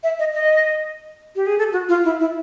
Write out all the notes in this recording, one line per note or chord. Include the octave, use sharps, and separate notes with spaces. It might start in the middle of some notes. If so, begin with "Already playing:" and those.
E5
D#5
D#5
G4
G#4
A4
F#4
F4
E4
E4